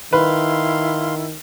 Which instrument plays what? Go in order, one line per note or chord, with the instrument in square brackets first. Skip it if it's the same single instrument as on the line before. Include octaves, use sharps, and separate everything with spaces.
[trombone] D#3 [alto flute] E4 [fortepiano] B4 [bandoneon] F5 C6